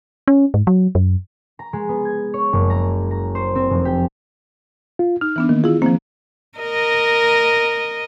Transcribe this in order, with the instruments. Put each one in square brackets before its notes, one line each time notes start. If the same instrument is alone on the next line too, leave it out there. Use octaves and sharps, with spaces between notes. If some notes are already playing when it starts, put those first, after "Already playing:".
[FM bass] C#4
G#2
F#3
F#2
[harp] A#5
G#3
B3
G#6
C#5
F#1
A#5
A#5
C5
C4
F1
G4
[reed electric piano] F4
[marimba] D#4 [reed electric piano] F6
[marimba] E3 B3 D4
[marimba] D#3 [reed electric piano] A#3
[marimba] E4 G#4 [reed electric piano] F4
[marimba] F3 A#3 [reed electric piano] C4
[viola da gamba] A#4 D#5